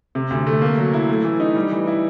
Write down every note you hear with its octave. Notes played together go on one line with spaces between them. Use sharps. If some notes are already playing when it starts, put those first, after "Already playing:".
C3
D2
A3
A#3
F#3
E4
A3
E3
D#4
G3
E3
E4